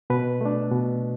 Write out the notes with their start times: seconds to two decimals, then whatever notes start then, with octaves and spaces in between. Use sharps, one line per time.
0.10 B2 B4
0.41 A3 D4
0.72 B2